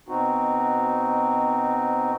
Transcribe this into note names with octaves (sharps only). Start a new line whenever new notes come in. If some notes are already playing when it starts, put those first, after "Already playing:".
B2 C4 D#4 F#4